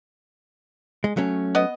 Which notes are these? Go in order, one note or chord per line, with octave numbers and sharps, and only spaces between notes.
G#3
F#3 A3 C#4
B3 D#5